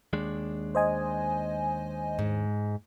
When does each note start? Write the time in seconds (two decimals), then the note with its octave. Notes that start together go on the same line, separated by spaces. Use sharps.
0.13 D#2 G#3 D4
0.75 C5 D#5 G#5
2.19 G#2